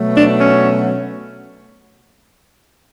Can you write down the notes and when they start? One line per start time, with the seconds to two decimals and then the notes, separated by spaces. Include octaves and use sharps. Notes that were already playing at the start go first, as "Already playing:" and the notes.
Already playing: B2 F#3 A3
0.16 D4
0.40 C#4